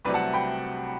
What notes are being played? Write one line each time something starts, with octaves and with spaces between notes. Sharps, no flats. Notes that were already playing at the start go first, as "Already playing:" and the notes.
C2 C3 F#3 A3 B4 D5
F#5 A5
G5 B5